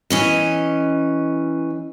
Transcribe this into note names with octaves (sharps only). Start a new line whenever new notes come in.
E3 C#4 D#5